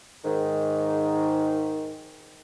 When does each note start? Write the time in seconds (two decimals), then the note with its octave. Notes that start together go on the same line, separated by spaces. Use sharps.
0.25 G#2 D#3